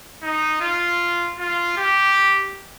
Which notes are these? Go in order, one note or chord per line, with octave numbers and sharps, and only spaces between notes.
D#4
F4
F4
G4